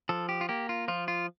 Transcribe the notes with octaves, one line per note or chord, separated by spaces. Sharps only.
F3 A4
G4
F4
A#3 G4
F4
F3 F4
F4